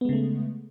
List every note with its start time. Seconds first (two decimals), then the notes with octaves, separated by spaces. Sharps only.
0.01 B3
0.05 G#3
0.09 C#3
0.13 A3